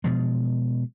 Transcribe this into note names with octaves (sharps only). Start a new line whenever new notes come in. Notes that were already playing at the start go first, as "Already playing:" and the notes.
B2 F3 G#3